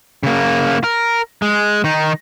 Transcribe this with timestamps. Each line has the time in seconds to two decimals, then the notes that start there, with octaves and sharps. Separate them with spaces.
0.23 C#3 A#3
0.84 A#4
1.42 G#3
1.84 D#3 D#4